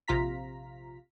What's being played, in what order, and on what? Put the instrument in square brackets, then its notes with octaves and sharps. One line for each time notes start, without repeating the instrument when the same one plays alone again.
[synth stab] A#1 C3 F4 A#5 B6